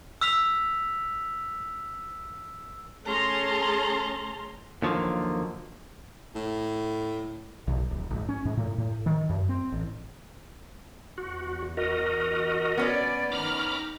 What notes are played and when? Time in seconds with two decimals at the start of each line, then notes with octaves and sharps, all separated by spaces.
0.21 E6 F6 B6 F7
3.05 A3 C#4 G#4 A5 A#5 C6
4.82 D#2 D3 F3 F#3 A#3
6.35 A2
7.68 B1
7.91 D1
8.11 G#1
8.29 C#4
8.45 G#2
8.57 A2
8.78 A2
9.06 D#3
9.29 F#2
9.49 C4
9.72 A1
11.18 E2 F#4
11.77 F#4 A#4 D#5
12.77 B3 C#4 D5
13.32 D#3 D#4 A#5 B5 D6 F6